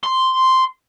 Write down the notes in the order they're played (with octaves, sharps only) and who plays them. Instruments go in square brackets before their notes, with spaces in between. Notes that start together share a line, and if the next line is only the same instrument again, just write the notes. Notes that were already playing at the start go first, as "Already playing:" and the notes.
[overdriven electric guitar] C6